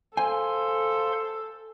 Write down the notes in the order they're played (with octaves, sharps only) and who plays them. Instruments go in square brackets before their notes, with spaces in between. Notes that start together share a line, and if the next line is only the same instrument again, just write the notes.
[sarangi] A4 [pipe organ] C5 F5 C6 [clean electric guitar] G#5